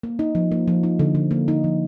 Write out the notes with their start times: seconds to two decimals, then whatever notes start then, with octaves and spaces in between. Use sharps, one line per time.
0.03 A#3
0.19 D#4
0.35 F3
0.52 A#3
0.68 F3
0.83 D#4
0.99 D3
1.15 D3
1.31 A#3
1.48 D#4
1.64 F3